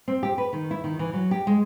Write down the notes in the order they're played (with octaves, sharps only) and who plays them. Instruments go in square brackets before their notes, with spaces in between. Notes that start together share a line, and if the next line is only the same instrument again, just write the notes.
[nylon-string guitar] C4
G4
B4
D#3
E4
D#3
E3
F#3
G4
G#3